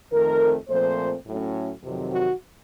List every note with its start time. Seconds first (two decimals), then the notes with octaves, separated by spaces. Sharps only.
0.12 F2 D#3 A3 C4 A#4
0.69 A#2 F3 A3 C4 C5
1.26 A2 F#3 A3 C#4
1.83 F2 C3 D#3 F#3
2.12 F#4